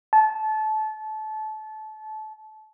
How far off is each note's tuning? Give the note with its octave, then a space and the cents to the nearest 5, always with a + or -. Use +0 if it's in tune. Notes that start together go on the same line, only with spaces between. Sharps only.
A5 -25